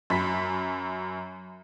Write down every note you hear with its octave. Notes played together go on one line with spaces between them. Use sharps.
F#2 B5 B6